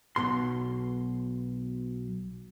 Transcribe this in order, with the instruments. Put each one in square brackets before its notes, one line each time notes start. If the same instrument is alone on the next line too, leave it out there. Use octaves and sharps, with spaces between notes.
[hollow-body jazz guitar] B1 B2 C6